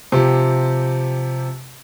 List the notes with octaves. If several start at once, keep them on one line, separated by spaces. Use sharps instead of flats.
C3 F3 G4